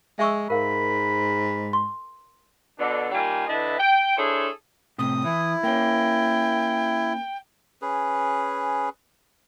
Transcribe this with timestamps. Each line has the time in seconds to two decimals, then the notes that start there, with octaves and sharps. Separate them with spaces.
0.19 G#3 E5 C#6 E6
0.50 G#2 A#4 F5 B5
1.73 C6
2.79 B2 D3 D4
3.12 D#3 G3 A#3 F4 G5 G#5
3.47 D3 E3 E4 B4 D#5 A5
3.79 G5
4.17 D4 E4 G#4 A4 C5 C#5
4.98 A2 C3 D#6
5.24 E3 E4
5.63 A#3 C#4 G5
7.82 C#4 G#4 B4